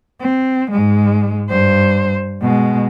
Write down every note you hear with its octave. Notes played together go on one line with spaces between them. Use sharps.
C4
G#2 G#3
G2 C5
B2 G#3